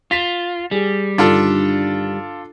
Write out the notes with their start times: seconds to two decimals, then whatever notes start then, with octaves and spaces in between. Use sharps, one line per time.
0.11 F4 A6 B6 E7
0.71 G3 G4 G#4
1.18 G2 D3 D#3 D4 F4 A4